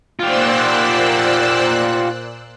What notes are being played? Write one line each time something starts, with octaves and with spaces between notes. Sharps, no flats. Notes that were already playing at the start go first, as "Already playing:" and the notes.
A#2 F4 G4 C5 D5 E6 F#6